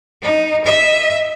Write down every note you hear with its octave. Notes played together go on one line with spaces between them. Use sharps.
D#4
D#5 E5